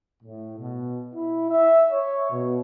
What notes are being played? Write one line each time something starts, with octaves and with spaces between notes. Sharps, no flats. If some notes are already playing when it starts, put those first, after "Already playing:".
A2
B2
E4
E5
C#5
B2